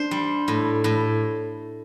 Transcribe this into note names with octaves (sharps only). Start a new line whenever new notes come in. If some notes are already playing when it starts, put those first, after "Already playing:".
Already playing: D4 C5
G3
A2
A2